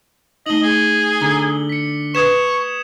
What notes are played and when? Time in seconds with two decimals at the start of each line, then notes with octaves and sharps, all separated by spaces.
0.46 A3 D#4 D#5 F#7 G7
0.63 G#4
1.22 D3 A#5
1.69 B6 C#7
2.15 B4 C#6 D#6 G#6 E7